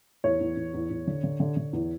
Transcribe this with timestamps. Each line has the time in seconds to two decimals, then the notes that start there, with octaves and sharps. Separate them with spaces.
0.24 E2 C#5
0.41 E2
0.57 E2
0.74 E2
0.90 E2
1.07 D3
1.24 D3
1.40 D3
1.57 D3
1.73 E2